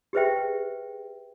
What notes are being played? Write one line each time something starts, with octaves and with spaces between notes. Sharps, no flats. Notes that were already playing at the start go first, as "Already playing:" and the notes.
G4 G#4 B4 C5 E5 G5